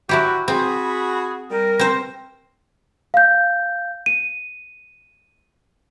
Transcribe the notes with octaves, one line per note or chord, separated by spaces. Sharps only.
F#3 E4 F#4 G4
C4 F#4 G#4 B5
G3 A#4
C4 C5
F5 G6
D#7